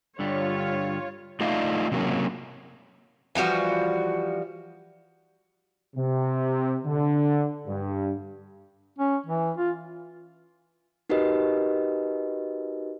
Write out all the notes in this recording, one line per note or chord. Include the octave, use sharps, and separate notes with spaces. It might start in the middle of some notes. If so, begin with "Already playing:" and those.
G2 D3 G3 F4 C#5
A3 D#4 F4 D5 D#5
C3 F#3 A#3 C#4
E3 F3 G3 F#4
C3
D3
G2
C#4
E3
F4
D#4 F#4 G4 A#4 B4 D#5